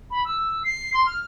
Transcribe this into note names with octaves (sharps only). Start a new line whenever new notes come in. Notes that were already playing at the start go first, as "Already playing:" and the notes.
B5
E6
C7
C6
F6